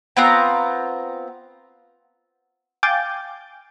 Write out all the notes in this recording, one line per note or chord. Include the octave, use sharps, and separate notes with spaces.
B3 C4 F4 A#5
F5 G5 G#5 D6 G6 A6